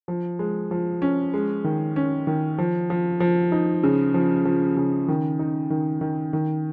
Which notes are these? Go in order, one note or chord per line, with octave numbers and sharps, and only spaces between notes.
F3
G#3
F3
C#4
G#3
D#3
C#4
D#3
F3
F3
F3
D#4
C#3
F3
F3
C#3
D#3
D#4
D#3
D#3
D#3